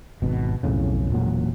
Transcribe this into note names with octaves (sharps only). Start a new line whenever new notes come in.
G#1 B2
B1 F2 A2 C#3
E1 A#2 F#3